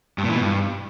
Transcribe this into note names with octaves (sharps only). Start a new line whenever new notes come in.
G2
A#2
E3
B2
G2